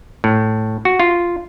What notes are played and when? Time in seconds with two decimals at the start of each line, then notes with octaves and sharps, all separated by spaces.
0.24 A2
0.85 F#4
1.00 F4